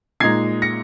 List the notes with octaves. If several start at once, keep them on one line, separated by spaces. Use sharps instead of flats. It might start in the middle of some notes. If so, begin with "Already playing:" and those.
A#2 G#3 D#4 G#6 C7
A#6 C#7